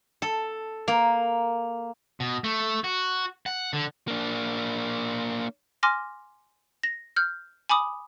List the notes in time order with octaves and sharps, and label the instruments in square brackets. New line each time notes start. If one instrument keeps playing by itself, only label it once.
[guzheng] A4
A#3
[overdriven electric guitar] B2
A3
F#4
F#5
D3
[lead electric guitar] A#3 D4
[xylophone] G#5 C6 D6 F6 A#6
A#6
F6 G6
G#5 B5 D6 D#6